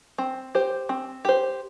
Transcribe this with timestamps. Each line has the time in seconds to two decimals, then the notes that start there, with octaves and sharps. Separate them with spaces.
0.18 C4
0.55 G4 C5
0.89 C4
1.25 G4 C5